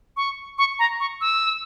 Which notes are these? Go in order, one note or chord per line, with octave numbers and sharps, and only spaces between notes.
C#6
C#6
A#5
C#6
E6